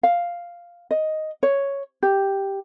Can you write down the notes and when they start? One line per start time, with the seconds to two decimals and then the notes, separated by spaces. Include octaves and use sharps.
0.03 F5
0.91 D#5
1.43 C#5
2.03 G4